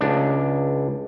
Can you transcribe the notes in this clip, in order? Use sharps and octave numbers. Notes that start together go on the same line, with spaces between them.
C#2 D4